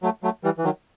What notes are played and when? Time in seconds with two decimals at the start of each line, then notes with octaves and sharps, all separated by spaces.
0.03 F#3 A3
0.23 F#3 A3
0.44 E3 G3
0.58 E3
0.64 D#3 F#3